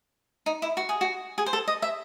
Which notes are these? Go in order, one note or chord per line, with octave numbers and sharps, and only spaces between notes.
D#4
E4
F#4
G#4
F#4
G#4
C5
A4
D#5
E5